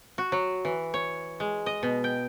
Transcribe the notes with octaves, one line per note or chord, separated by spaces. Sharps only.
F#4
F#3
E3
C#5
G#3
D#5
B2
G5